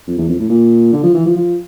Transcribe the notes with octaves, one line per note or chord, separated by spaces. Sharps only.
F2
E2
F2
A2
A#2
D3
F3
E3
F3
F3